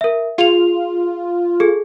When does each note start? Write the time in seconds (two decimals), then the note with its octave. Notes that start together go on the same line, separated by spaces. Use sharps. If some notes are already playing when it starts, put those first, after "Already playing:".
0.01 A#4 E5
0.38 F4 G#4 F7
1.60 G#4 A4